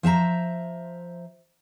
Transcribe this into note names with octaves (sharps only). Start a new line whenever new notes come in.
F3 C5 E5 A#5